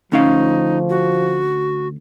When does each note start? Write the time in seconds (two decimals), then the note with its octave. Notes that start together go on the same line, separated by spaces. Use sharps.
0.12 D2 F3 C#4 D#4 F5
0.90 F#4